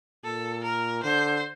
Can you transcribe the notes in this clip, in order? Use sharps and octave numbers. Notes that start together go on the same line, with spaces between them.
A#2 A4
A#4
D3 C5